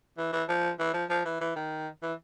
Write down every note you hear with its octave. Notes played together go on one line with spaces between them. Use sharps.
E3
E3
F3
E3
F3
F3
E3
E3
D#3
E3